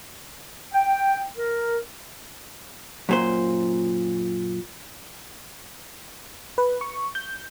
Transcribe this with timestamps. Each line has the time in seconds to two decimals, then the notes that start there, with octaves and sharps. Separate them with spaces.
0.73 G5
1.37 A#4
3.09 F#2 A#2 C5
6.58 B4
6.81 C#6
7.15 G6